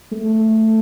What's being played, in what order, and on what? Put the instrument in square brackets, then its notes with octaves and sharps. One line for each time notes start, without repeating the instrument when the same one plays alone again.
[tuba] A3